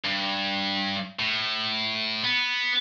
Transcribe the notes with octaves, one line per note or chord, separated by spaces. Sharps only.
G2
A2
B3